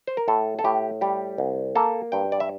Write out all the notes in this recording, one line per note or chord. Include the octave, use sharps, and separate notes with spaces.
C5
A#4
A2 A4
A4
A2 G4
G3 G4
C2
A#3 A4
G2 G5
D5
E5